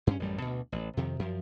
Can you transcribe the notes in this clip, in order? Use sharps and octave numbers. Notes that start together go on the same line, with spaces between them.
G2 C4 C#4
A1 F#2 A2 G3
D2 B2
A1
F2 C3 D#3
F#2 F3